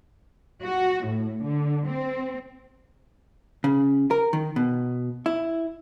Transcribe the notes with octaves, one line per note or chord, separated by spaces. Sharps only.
F#4
A2
D3
C4
C#3
A#4
D#3
B2
E4